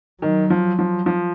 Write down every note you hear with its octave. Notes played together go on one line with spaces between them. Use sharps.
D#3 F#3
F3
F3
F3